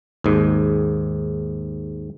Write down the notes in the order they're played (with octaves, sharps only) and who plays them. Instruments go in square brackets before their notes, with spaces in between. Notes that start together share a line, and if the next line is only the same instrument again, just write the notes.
[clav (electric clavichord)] D#2 G#2